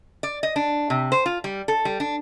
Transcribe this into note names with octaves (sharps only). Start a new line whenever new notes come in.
D5
D#5
D4
C3
C5
F4
G3
A4
G3
D4